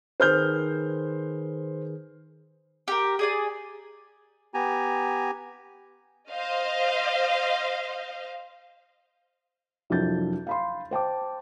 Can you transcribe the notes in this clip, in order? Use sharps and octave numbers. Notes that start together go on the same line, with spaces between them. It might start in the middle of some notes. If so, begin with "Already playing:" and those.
D#3 G#4 B4 C5 F6 G6
G4 A#4
G#4 D5 G#5
B3 G4 G#5 A#5
C5 D#5 F5
C2 F2 F#3 D4 G6 A6
F5 B5 C6
C5 G5 A5 D6